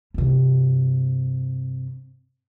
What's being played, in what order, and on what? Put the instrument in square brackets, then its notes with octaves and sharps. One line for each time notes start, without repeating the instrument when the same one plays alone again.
[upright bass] G2 C3